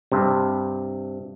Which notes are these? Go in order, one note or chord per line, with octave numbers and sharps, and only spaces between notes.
G2 C3